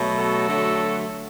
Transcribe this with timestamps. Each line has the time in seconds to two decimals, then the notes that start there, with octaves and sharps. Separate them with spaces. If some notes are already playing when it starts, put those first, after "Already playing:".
Already playing: B2 F#3 A3
0.18 F#4 A4
0.49 D3 F#3 A3